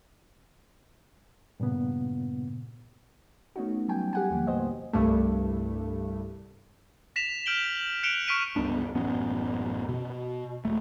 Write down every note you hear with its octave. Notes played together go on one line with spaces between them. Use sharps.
G2 A#2 C#3 B3
A3 B3 C#4 D#4 F#4
F#3 G3 G5 G#5
G4 F#5 G#5
D#2 A#2 D3 F3 A#3
C2 A2 F#3 B3 C5 D#5
C2 G2 A3
A#6 B6 E7 F7
F6 G6 D7 F#7 G7
F#6 C#7 D7 E7 F7 G7
C#6 F6 B6 D7 D#7
C#2 G2 B3 D4
A1 F#2 B3 C#4
B2
D#1 A3